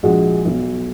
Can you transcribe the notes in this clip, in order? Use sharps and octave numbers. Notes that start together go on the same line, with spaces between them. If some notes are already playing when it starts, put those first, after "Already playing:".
A#1 G#3 F#4
B1